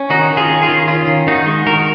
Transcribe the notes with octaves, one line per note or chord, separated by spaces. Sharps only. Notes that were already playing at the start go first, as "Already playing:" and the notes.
Already playing: C#4
D#3 D#4 F#4
D#3
F4 G#4
C#4
F4 G#4
D#3
C#4 F4
D#3
D#3 D#4 F#4
G#3
D#3 F#4 A#4